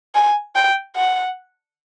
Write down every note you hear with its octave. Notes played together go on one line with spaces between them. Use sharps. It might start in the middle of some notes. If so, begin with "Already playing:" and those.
G#5
G5
F#5